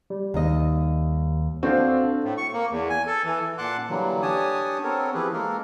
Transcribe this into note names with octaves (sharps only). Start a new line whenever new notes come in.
G3
D#2 D#5
C4 D4 F#4 A4 F5
A2
C#6
A#3
E2
G#5
A4
E3
A#2 F#5 A5 C6 D6 F#6
D3 E3 F#3 G3 A#3
D4 G4 C#5 G#5 A5 D#6
B3 C4 A4 A#4 C#5
E3 F3 E4 G4 G#4 B4
G#3 A#3 A4 A#4